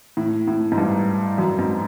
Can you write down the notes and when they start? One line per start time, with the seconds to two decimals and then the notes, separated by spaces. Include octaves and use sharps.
0.17 A2
0.48 A2
0.72 G#2
0.78 G2
1.38 F#2
1.59 G#2